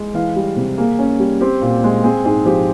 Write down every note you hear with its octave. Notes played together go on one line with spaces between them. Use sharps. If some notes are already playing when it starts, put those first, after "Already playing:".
Already playing: G#3
E3 F5
G3
C3
A#3 G#4
C#4
G3
C4 G4
A#2
G#3
C4 G#4
G#2 G#4
F3 G4